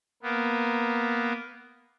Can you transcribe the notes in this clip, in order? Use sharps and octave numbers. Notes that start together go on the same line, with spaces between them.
A#3 B3